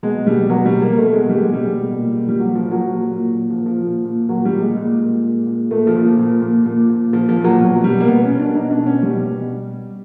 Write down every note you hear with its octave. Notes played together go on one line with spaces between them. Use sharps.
B2 G#3
B2 G3
B2 F#3
G3
B2
A#3
B2 A3
G#3
B2
G3
B2 G#3
G3
B2
A#2
A#2
G3
A#2 F#3
F3
A#2
F#3
A#2
A#2
A#2
F3
A#2
F3
A#2
A#2
A#2 F#3
G3
A#2
G#3
A#2
A#2
A#2
A#2
A#2 A3
F3
A#2
F3
A#2
A#2
A#2
A#2
A#2 F3
F3
A#2
F#3
B2 F#3
B2 G3
A#3
B2 B3
C#4
B2
D4
B2 D#4
D4
B2
C#4
B2 G3
B2